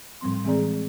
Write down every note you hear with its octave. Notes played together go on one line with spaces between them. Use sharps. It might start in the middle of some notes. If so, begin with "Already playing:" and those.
A2 F3 G3 C4 C6
E3 G#3 C4 G#4 D5 A#5